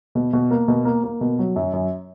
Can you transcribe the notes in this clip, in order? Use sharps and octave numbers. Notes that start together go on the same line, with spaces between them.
B2
B2
A#3
B2
A#3
A#3
B2
F#3
F#2
F#2